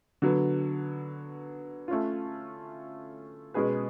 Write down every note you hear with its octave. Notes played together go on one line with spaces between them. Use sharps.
D3 F#3 B3
A3 C#4 F4
B2 G#3 C#4 G#4 B4